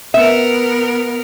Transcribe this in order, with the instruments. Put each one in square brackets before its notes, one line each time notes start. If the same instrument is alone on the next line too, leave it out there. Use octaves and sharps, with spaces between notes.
[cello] B3 A#4 [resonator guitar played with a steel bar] E5